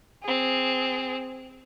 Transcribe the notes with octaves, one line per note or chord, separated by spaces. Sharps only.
C4 G#4